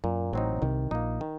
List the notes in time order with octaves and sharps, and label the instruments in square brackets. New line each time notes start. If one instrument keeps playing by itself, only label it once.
[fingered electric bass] F#2 [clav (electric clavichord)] A#2
[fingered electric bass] A1 A2 [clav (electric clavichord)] F#3 C4 D#4
[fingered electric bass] A#2
[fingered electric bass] C2 C3 [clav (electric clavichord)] D#3
[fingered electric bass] A#1 A#2 [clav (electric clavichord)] A#3 D#4
[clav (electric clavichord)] D#3